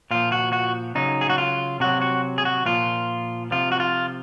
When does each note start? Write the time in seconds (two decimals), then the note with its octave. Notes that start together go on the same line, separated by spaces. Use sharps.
0.11 A#2 F3 F4
0.32 F#4
0.53 F#4
0.95 C#3 F#3 D#4
1.21 G#4
1.30 F#4
1.38 F4
1.80 C3 F#3 F#4
2.01 F#4
2.38 G#4
2.45 F#4
2.66 A#2 F3 F4
3.51 C3 F3 F4
3.72 F#4
3.80 F4